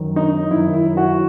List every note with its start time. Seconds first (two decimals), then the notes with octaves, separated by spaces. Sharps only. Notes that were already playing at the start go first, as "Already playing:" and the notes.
Already playing: F#2 D#3
0.16 D#4
0.51 F#2 D#3 E4
0.73 E4
0.97 F#4